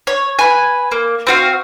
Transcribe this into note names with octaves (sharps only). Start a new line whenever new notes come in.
C#5
B4 G#5
A#3
C4 F#4 F5